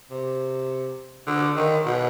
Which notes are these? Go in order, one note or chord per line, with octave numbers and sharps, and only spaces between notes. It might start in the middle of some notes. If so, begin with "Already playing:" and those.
C3
D3
D#3
B2